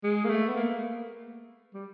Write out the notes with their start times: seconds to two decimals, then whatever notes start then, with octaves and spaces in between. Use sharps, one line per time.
0.04 G#3
0.25 A#3
0.30 A3
0.49 B3
0.56 A#3
1.74 G3